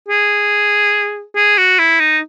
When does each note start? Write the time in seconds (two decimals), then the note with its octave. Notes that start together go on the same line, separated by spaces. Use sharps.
0.08 G#4
1.36 G#4
1.58 F#4
1.79 E4
2.00 D#4